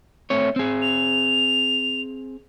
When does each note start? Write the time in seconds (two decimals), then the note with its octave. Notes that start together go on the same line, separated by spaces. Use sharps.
0.30 A3 C4 C#5
0.56 C4 G#4
0.82 F7